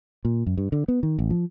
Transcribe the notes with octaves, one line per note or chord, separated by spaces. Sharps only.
A#2
F#2
G2
D3
B3
D#3
A1
F3